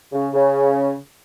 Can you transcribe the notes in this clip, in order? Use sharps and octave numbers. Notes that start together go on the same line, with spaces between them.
C#3
C#3